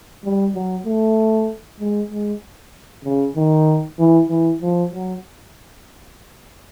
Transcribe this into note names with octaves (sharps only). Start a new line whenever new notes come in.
G3
F#3
A3
G#3
G#3
C#3
D#3
E3
E3
F3
F#3